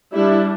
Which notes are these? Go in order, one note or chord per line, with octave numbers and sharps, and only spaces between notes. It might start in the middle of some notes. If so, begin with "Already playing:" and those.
G3 D4 E4